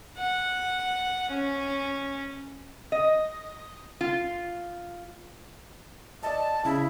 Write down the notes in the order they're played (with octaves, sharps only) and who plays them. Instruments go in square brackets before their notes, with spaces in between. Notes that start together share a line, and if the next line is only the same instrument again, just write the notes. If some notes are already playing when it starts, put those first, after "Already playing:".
[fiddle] F#5
C#4
[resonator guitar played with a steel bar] D#5
F4
[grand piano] D5 D#5 [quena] A5
[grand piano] C#3 [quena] E4